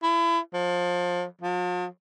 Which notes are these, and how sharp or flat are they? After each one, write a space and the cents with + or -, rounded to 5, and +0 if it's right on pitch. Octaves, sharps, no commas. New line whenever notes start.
E4 +30
F3 +25
F3 +45